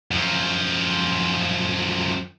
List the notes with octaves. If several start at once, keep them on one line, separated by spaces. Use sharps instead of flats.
F#2 F3